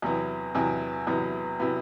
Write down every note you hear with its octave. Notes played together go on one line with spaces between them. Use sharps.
E2 C3 F#3 B3 E4
E2 C3 F#3 B3 E4
E2 C3 F#3 B3 E4
C3 F#3 B3 E4